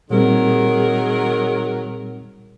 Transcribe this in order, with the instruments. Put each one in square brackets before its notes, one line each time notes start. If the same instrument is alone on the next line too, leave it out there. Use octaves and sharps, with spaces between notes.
[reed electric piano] A#2 G3 C4 [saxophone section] D#3 F#3 A#4 [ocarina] G#4